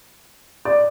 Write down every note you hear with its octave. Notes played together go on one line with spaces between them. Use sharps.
D5